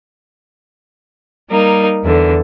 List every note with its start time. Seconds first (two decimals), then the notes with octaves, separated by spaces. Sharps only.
1.50 G3 A#3 D#4
2.04 E2 D3